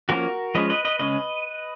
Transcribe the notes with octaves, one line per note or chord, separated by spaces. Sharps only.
F3 A#3 C#4 F#4 A#4
F3 G#3 C#4 B4 D#5
B4 D#5
B4 D#5
C#3 G#3 C#4 B4 D#5